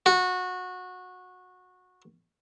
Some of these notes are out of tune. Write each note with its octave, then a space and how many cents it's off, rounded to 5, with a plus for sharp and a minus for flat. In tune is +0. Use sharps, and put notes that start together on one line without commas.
F#4 -20